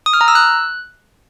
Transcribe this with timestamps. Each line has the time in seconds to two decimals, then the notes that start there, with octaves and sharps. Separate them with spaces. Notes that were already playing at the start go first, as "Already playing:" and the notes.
0.06 D#6
0.13 F6
0.21 A#5
0.28 E6
0.35 F#6